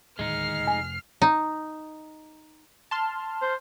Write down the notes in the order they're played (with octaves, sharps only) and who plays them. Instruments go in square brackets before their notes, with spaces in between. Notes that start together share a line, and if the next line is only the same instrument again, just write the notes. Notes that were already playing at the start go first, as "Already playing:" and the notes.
[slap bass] D1 D#2 A2 [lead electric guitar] G#3 D#4 [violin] F6 C7
[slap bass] F2 C3 A3 [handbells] G#5
[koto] D#4
[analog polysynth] A5 C6 F6
[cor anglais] C5